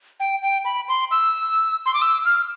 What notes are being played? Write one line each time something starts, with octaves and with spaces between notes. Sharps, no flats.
G5
G5
B5
C6
E6
C6
D6
E6
F6